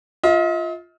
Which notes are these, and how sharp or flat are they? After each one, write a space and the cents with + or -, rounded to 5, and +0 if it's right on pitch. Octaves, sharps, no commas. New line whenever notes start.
F4 +0 D#5 +45